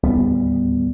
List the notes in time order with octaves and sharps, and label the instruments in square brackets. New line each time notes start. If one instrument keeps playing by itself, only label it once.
[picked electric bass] D1 D#2 G3 B3